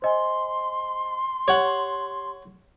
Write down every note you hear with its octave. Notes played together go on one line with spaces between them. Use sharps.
C5 D#5 G#5 C6
G4 C#5 F#5